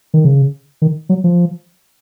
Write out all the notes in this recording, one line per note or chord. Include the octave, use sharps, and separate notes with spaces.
D#3
C#3
D#3
F#3
F3